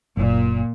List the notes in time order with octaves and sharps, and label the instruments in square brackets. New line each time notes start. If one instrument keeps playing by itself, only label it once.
[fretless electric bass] F#1 [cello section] A#2